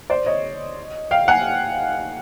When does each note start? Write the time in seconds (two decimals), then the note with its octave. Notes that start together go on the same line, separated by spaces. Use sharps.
0.10 C5 D5
0.26 C#5 D#5
1.11 F5 G5
1.28 F#5 G#5